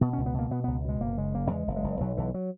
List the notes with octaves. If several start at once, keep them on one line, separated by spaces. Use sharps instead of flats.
B2 B3
C#2 C#4
B3
B2 A#3
B2 B3
C#2 B3
B2 G#3
F#1 A#3
C#3 G#3
F#1 A#3
E2 G#3
F#1
G#3
F#1
B1 F#3
B1 E3
F#3